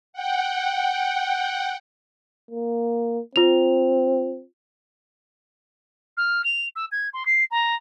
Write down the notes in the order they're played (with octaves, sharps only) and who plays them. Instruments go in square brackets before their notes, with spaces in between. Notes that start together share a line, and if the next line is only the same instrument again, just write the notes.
[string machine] F#5 G5
[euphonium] A#3
[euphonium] C4 [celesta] F4 F7
[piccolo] F6
F7
E6
G#6
C6
C7
A#5